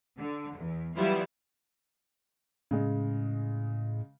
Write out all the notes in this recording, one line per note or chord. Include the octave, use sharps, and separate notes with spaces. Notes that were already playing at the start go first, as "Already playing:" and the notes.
D3
E2
E3 F#3 G3 B3 E4 F4
A2 C#3 G#3